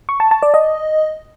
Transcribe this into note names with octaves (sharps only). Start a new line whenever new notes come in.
C#6
A5
A5
D5
D#5